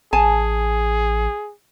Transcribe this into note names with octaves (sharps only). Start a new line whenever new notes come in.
A1 G#4 G#5 A5